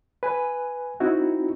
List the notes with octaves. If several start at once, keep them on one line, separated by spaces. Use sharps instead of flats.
B4 G#5
C4 D#4 E4 F#4